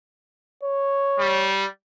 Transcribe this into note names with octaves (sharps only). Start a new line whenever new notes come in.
C#5
G3